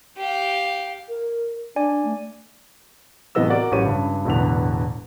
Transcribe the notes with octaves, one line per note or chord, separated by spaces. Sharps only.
G4 F5
A#4
D4 D5 G#5
A3
A2 C3 E3 B3 D#5 E6
F#4 A#4 D5
A1 F#3 G4 C#5 D#7
C#2 G2 C#3
E1 E2 A2 D3 B4 F7